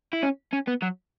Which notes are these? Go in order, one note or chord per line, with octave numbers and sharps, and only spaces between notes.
E4
C#4
C#4
B3
F#3